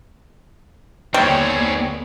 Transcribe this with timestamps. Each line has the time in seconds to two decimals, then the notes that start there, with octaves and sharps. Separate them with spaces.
1.14 D#2 D3 G3 B3 C4 G#4 C#5